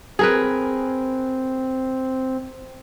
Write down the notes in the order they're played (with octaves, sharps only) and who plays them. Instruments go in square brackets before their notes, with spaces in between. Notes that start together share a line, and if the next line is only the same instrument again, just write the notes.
[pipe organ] C4 [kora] G#4 A#4 B4